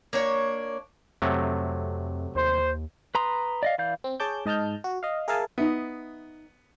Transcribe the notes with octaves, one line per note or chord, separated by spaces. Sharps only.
A#3 D4 C#5
F2 C3 F#3 A3
D#2 C5
B4 A#5 C6 D#6
D5 D#5 F5
E3 D5 F5 G6
C4
G#4 C#5 A5 D6 G6
G#2 D#5 A5 F6 G6
F#4
D#5 F5
G#4 A#4 E5 F5 G#5 A5
B3 D#4 E5